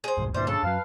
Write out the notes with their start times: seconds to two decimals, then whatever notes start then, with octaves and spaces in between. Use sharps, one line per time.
0.04 G#4 C5
0.18 E1 C2 G#2
0.34 G2 A#2 D3 E3 G3 C5
0.47 C#3 D4 A4 A5
0.63 F#2 F#3 B4 F5